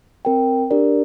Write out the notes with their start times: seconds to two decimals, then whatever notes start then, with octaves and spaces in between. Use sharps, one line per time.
0.25 C4 A#4 G5
0.71 D4 G4 A#4 D5